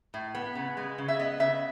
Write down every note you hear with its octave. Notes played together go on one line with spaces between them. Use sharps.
A2
B3
C#3
G#3
C#3
E5
B3 D#5
C#3 E5